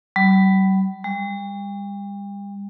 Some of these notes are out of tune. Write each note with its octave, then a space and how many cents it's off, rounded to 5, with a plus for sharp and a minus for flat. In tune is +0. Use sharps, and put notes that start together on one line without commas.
G3 -40
G3 +40